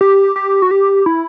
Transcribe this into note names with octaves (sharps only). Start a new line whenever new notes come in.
G4
G4
F#4
G4
E4